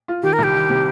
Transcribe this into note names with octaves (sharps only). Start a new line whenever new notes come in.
F4
D#3 G4
A#4
C2
G4
D#3
C3